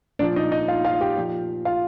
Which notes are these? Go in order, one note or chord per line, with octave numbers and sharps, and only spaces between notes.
A#2 F3 D4 D5
D#4 D#5
D#4 D#5
F4 F5
F4 F5
G4 G5
A#2 F3
F4 F5